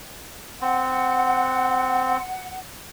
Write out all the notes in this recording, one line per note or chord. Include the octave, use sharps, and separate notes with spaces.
C4 F#5